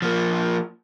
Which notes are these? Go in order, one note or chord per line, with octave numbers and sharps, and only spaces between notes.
F3 A#3